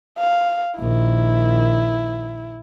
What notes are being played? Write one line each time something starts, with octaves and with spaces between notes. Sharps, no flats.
F5
A#1 D#3 E4